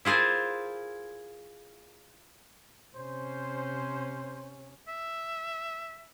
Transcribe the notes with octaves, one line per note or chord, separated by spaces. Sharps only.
E4 F4 G#4 A#4 C5
C3 C#4 C5
E5